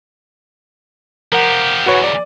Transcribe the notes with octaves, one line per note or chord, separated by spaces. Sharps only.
F3 G4 A#4 F#5
E2 G#2 F#4 B4 C#5
D5